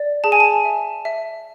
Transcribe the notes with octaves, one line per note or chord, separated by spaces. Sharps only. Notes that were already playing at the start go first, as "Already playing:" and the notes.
Already playing: D5
G#4 A5
G#5
A5
E5
E5